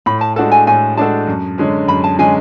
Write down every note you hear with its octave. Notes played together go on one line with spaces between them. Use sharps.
A2 B5
A5
G#3 D4 F#4 A4 A5
G#5
A2 G#5
G#3 D4 F#4 A4 A5
F#2
D3 G#3 C#4
F#2 B5
A5
D3 G#3 C#4 G#5